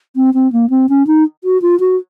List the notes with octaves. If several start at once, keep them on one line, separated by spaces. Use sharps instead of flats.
C4
C4
A#3
C4
C#4
D#4
F#4
F4
F#4